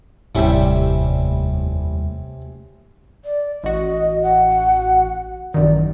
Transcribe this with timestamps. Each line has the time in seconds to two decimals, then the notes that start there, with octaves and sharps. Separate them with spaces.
0.35 F1 D#2 A2 C3 G3 C#4 E5
3.25 D5
3.64 A1 F#4 D#5
4.22 F#5
5.54 A1 F#2 D#3 D5